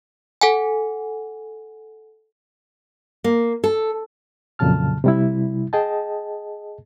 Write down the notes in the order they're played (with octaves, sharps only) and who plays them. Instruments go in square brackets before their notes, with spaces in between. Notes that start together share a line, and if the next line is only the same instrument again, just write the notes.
[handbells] A4 F#5 G#5
[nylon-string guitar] A#3
A4
[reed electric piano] F2 A#2 C#3 F#3 A5 F6
C3 G3 E4
G#4 D#5 G5 A5